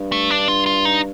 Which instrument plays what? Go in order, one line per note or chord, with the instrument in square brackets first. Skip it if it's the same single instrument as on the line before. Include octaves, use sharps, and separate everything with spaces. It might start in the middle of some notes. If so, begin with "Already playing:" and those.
Already playing: [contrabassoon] G2
[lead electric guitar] A3
D4
F4
F4
D#4